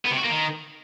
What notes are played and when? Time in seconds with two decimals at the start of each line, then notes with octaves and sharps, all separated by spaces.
0.05 B3
0.11 C3
0.18 F#4
0.24 A#3
0.30 D#3